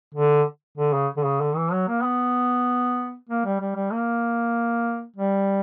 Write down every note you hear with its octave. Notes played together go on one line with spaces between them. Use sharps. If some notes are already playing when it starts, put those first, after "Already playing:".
D3
D3
C#3
D3
C#3
D3
E3
F#3
A#3
B3
A#3
G3
G3
G3
A#3
G3